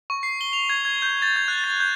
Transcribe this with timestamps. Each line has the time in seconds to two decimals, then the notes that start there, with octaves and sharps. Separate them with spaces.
0.10 C#6
0.23 C7
0.41 G7
0.53 F7
0.70 G#6
0.85 G#6
1.02 G6
1.22 A6
1.36 G#6
1.48 F#6
1.64 A6
1.80 G6